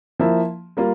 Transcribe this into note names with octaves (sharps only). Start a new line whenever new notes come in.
F3 A#3 E4
G3 A#3 F4